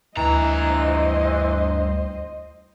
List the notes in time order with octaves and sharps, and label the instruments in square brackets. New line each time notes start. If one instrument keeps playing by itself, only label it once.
[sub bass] D2 [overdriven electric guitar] G2 A#5 [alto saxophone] E3 [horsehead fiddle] C5 D#5